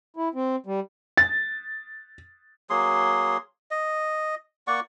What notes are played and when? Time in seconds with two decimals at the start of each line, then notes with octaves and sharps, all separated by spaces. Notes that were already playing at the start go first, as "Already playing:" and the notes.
0.17 E4
0.35 C4
0.66 G3
1.17 A6
2.70 F#3 A#3 G#4 C6
3.71 D#5
4.67 A#3 D5 F#5 C#6